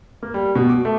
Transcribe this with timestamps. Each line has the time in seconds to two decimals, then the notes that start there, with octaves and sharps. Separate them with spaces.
0.23 A#3
0.34 G3
0.56 B2
0.69 D6
0.85 A3